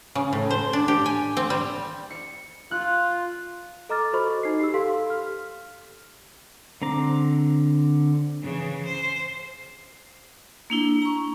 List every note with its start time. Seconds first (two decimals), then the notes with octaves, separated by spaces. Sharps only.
0.15 C#3
0.33 A2
0.51 C5
0.73 D4
0.88 G4
1.06 G#5
1.37 C4
1.50 G3
2.10 C#7
2.71 F4 F#6
3.89 A4 D#5 A#5 D6 F6 A6
4.13 F#4 A4 C5 D#5 B5 C#6
4.43 D#4 C7
4.60 G4 E6
4.74 G4 A4 F5 C6 B6
5.10 F6
6.82 D3 C4 A#5 D6
8.42 C#3 E3
8.85 C5
10.70 A#3 D4 E4
11.02 A#5 C#6